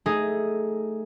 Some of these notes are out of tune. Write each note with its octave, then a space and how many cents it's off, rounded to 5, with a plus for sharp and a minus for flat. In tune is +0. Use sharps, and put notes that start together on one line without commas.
A3 +0 D#4 +0 G#4 +0